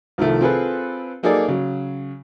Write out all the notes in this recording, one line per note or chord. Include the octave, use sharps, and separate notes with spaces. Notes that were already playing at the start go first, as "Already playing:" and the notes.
C2 D#3 F3 A3
C4 F4 G#4 A4 B4
F#3 A#3 D#4 G#4 A4 D5
C#3 F#3